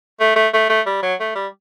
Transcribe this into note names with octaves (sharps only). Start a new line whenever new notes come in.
A3
A3
A3
A3
G3
F#3
A3
G3